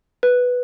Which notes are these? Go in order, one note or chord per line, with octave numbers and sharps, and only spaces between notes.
B4